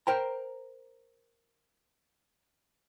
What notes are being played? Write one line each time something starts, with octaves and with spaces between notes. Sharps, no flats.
A#4 C5 G5 A#5